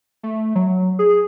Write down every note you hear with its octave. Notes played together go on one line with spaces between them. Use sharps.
A3
F#3
G#4